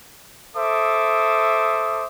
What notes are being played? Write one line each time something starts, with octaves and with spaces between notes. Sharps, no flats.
A4 C5 E5 D6 D#6